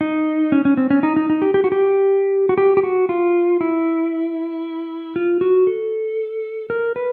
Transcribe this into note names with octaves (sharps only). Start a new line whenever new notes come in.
D#4
C#4
C#4
C4
C#4
D#4
D#4
D#4
G4
G4
F#4
G4
F#4
G4
G4
F#4
F4
E4
F4
F#4
A4
A#4
B4